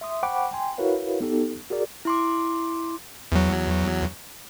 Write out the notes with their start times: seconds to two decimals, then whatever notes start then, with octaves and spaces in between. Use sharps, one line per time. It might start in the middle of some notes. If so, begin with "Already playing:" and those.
0.01 E5 C6 D#6
0.23 C5 F#5 G5 B5 C#6 D6
0.52 G5 G#5 C6
0.78 E4 F#4 A#4 B4 C#5 F5
1.21 B3 D#4 G4 A4
1.70 F#4 G#4 A#4 D5
2.05 E4 C6 D6
3.32 E2 F#3